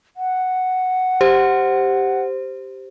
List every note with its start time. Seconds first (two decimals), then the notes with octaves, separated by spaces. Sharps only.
0.17 F#5
1.21 G4 C5